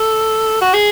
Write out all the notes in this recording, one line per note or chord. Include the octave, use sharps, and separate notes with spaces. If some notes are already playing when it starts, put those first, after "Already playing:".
Already playing: A4
F#4
G#4